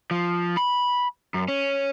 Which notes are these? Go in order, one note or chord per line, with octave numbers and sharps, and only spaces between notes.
F3
B5
F#2
C#4